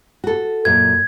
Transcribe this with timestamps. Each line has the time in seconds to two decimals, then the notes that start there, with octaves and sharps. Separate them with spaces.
0.24 F#4 A4
0.65 F#2 A#2 G#6